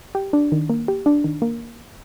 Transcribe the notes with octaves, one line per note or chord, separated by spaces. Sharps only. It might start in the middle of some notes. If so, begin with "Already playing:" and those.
G4
D4
D#3
A#3
G4
D4
D#3
A#3